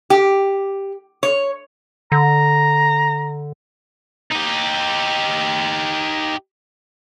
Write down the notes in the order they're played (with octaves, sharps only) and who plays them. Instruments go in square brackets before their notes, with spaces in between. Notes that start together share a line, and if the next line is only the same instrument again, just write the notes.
[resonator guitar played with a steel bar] G4
C#5
[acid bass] D3 [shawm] A#5
[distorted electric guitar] D#4 G4